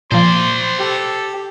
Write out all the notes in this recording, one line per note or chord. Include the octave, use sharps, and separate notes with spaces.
A#2 F3 C5 D5 C6
G4 A4